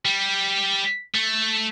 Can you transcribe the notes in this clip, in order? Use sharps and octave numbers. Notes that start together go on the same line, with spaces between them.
G3
A3